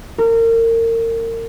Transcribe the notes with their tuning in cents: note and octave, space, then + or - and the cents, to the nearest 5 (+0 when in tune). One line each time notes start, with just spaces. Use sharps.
A#4 -30